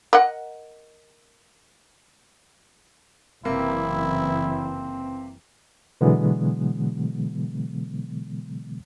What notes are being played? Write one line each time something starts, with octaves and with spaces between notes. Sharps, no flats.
A#4 D#5 F#5
F#1 C3 E3 A#3 C4 E4
B2 D3 E3 F#3 G#3 B3